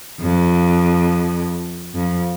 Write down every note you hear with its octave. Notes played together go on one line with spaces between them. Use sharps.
F2
F2